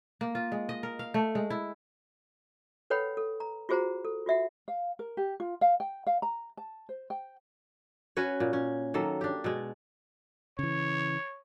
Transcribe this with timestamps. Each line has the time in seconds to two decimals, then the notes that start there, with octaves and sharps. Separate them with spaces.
0.21 A#3
0.35 F4
0.52 G#3
0.69 D#5
0.83 A#4
0.99 F5
1.14 A3
1.35 G#3
1.50 E4
2.90 A4 B4 C#5 F#5 G5 B5
3.17 A4
3.40 A#5
3.69 F4 F#4 G#4 C5 F#5 A#5
4.05 A4
4.26 F4 F#4 E5 F#5
4.68 F5
4.99 A#4
5.17 G4
5.40 F4
5.61 F5
5.80 G5
6.07 F5
6.22 A#5
6.57 A5
6.89 C5
7.10 G5
8.17 C#4 F#4 B4 C#5
8.40 A#2
8.53 C#4
8.94 D#3 F#3 A#3 A4
9.21 D4 G4
9.44 B2 G#3
10.59 C#3 E3 C#5